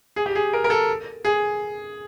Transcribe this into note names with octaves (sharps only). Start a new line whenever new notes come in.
G#4
G4
G#4
A#4
A#4
A4
G#4